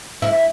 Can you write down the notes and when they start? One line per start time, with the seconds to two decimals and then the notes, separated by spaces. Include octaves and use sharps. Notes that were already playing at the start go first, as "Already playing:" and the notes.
0.22 E4